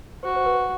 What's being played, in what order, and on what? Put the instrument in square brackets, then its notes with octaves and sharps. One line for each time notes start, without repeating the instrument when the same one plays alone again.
[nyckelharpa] F#4 [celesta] C5
[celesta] C5
B4